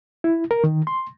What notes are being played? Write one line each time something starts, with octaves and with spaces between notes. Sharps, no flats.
E4
A#4
D#3
C6